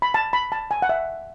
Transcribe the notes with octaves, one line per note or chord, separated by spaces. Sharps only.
B5
A5
B5
A5
G#5
F#5
E5